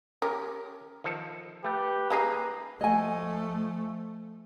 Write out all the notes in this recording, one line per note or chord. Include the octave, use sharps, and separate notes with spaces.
C#4 G4 A#4
D#3 F3 A4
A3 G4 B4
G3 G#3 A#3 D#4 G#4 F5 A#5
F3 A3 D#5 G#5